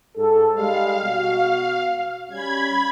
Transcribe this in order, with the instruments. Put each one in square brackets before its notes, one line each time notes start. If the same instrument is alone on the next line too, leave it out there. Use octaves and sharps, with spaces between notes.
[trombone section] G#2 A4
[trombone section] G3 G#3 [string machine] F5
[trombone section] B2 F#4
[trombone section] G3 C#4 [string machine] B5 G#6